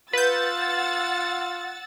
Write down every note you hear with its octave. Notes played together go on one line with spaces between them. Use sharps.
F4 B4 F#5 E6 G6 A6